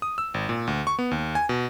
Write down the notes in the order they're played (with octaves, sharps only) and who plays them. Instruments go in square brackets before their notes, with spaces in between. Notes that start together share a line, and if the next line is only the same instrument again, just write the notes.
[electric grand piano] D#6
E6
G#1
A#2
D2
C#6
B3
D#2
G#5
B2